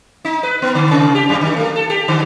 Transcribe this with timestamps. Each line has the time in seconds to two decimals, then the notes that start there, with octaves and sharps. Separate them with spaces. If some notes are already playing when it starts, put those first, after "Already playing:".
0.25 D#4
0.43 B4
0.62 B3
0.75 D3
0.91 C3
1.15 G4
1.29 F#2
1.41 D#3
1.56 A3
1.76 A4
1.90 G4
2.08 D3